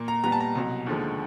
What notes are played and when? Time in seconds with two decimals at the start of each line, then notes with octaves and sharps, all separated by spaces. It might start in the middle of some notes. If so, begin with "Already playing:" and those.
Already playing: A#2 A#3
0.08 A#5
0.24 A#2 G3 B3 A#5
0.32 A5
0.40 A#5
0.55 C2 B2 F#3
0.87 D#2 D3 F3 G#3